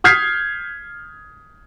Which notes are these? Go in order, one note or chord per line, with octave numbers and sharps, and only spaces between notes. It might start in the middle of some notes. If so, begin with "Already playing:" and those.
D#6 F6 G6 G#6 B6 C7